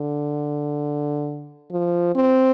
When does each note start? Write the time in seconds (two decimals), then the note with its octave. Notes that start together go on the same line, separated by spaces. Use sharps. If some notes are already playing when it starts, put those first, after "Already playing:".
Already playing: D3
1.71 F3
2.16 C4